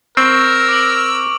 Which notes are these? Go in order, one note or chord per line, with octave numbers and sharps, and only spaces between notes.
C4 A#4 C#6 E6
D6 D7 F#7